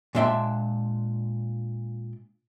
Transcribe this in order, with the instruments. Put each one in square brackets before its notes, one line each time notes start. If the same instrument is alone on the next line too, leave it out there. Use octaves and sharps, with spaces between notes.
[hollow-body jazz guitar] A#2 G#3 D4 E5 G5 C6